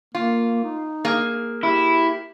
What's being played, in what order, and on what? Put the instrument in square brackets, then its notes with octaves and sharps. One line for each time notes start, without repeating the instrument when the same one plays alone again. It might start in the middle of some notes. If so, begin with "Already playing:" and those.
[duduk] A#3 [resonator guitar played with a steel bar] F4
[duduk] D#4
[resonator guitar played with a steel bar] A#3 G#4
[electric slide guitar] E4 [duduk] G4